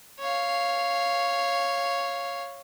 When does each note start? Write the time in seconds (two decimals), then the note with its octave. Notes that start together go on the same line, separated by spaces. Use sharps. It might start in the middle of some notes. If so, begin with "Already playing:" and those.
0.20 C#5 F5